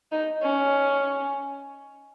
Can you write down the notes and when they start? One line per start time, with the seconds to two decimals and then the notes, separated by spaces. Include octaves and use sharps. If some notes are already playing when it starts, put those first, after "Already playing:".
0.12 D#4
0.42 C#4